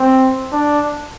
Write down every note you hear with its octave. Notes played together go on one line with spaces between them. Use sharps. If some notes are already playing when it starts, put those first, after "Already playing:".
Already playing: C4
D4